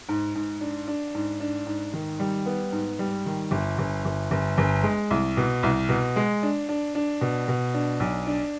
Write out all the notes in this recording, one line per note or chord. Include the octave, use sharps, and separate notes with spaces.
G#2
G#2
D4
D4
G#2
D4
G#2
D#3
G3
B3
G#2
G3
D#3
G1
G1
G1
G1
G1
G#3
C2
B2
C2
B2
G#3
D4
D4
D4
B2
B2
D4
B1
D4